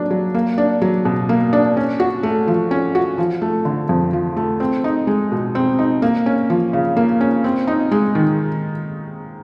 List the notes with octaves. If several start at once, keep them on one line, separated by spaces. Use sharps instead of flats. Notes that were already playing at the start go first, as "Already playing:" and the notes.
Already playing: F#3 A#3 D4
F#3
A#3
D4
F#3
B2
A#3
D4
C#4
F#4
A3
F3
C#4
F#4
F3
A3
D3
F2
F3
A3
C4
D#4
G#3
B2
C4
D#4
A#3
C#4
F3
C#3
A#3
C#4
C4
D#4
G#3
D#3